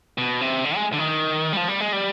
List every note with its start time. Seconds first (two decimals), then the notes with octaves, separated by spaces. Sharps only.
0.18 B2
0.41 C3
0.65 D3
0.76 G#3
0.93 D3
0.99 D#3
1.53 G3
1.57 F3
1.68 G3
1.81 G#3
1.93 G3